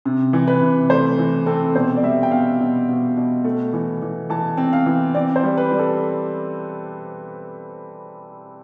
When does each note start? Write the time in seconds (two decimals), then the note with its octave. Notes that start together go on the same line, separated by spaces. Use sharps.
0.05 C3
0.33 E3
0.47 B4
0.61 C3
0.90 A3 C5
1.19 E3
1.46 C4 A4
1.75 B2 C5
1.96 D5
2.03 G3 E5
2.23 G5
2.31 B2 F5
2.60 B2
2.89 B2
3.17 B2
3.44 A3
3.73 E3
4.02 E3
4.30 E3 A5
4.58 C4
4.73 F5
4.86 E3
5.14 C4 D5
5.36 C5
5.43 G3
5.58 B4
5.72 G3
5.79 A4